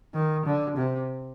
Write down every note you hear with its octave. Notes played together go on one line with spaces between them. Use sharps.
D#3
D3
C3